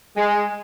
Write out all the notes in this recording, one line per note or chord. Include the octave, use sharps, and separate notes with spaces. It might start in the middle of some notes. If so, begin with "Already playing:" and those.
G#3